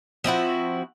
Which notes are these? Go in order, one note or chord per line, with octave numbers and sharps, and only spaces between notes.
F3 C4 E4 F#4